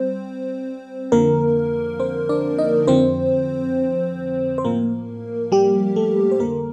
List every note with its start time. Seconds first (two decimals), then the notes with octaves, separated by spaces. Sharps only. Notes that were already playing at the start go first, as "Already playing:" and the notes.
Already playing: G3 C4 C5
1.12 F2 D3 F3 A#3 A#4
1.99 C4 C5
2.29 D4 D5
2.58 D#4 D#5
2.87 F2 D3 F3 C4 C5
4.58 C5
4.64 A2 F3 A#3 A#4
5.52 G3 G4
5.96 A3 A4
6.31 C5
6.39 F2 D3 G3 A#3 A#4